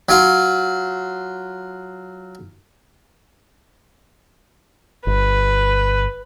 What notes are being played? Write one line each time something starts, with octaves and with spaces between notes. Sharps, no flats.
F#3 F4
G1 B4